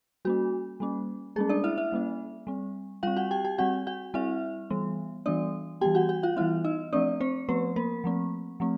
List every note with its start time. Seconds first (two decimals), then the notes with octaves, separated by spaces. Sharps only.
0.25 G3 A#3 C#4 F#4
0.80 G3 A#3 C#4
1.36 G3 G#3 A#3 C#4 G#4
1.49 D4 D5
1.64 E4 E5
1.78 E4 E5
1.92 G3 A#3 C#4
2.47 G3 C4
3.03 G3 C4 F4 F5
3.17 F#4 F#5
3.31 G4 G5
3.45 G4 G5
3.58 G3 C4 F#4 F#5
3.87 F#4 F#5
4.14 G3 C4 E4 E5
4.70 E3 G3 B3
5.26 E3 G3 B3 D4 D5
5.81 E3 G3 B3 G4 G5
5.95 F#4 F#5
6.09 F#4 F#5
6.23 F4 F5
6.36 E3 G3 B3 E4 E5
6.64 D#4 D#5
6.93 F3 A3 C4 D4 D5
7.20 C4 C5
7.49 F3 A3 B3 C4 B4
7.76 A#3 A#4
8.04 F3 A3 C4
8.60 F3 A3 C4